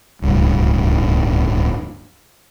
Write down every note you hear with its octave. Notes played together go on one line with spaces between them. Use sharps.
D1 C#2 G2